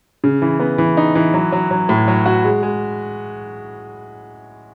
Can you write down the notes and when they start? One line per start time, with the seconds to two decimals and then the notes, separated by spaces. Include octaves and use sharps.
0.24 C#3
0.42 E3
0.60 B3
0.78 E3
0.97 D#4
1.15 E3
1.34 F#3
1.52 F#3
1.71 F#3
1.89 A2
2.08 F#3
2.26 F#4
2.44 G#3
2.63 G#3